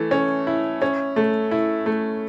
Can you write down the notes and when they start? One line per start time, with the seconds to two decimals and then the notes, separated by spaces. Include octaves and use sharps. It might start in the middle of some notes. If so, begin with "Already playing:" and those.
Already playing: E3 A3
0.11 C#4
0.47 E4
0.82 C#4
1.16 A3
1.51 E4
1.86 A3